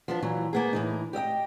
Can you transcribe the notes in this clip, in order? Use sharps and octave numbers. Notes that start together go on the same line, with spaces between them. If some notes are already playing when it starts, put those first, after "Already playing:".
F3 B3 D4
A#2 E3 F#3
A#3 B3 G#4
A2 E3 D#4
G4 D#5 E5 G5